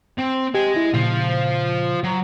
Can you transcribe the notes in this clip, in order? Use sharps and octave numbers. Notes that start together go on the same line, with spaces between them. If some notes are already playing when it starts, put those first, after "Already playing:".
C4
G4 D#5 G#5
E4
A#2 C#3 F4 C5
F#3